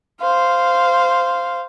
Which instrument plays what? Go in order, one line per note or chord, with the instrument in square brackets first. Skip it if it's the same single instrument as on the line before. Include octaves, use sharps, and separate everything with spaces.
[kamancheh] C5 F5